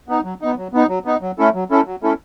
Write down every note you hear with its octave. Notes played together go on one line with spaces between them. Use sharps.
B3 D#4
F#3
B3 D#4
F#3
B3 D#4
F#3
B3 D#4
F#3
A3 C#4 E4 A4
F#3
A3 C#4 E4 A4
F#3
A3 C#4 E4 A4